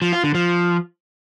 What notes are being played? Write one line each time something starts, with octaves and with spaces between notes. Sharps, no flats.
F3
F4
D3
F3